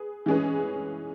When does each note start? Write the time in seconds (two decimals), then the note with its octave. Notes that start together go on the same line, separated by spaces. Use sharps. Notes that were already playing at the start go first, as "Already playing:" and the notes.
Already playing: G#4 B4
0.26 E3 G#3 C#4 G#4 B4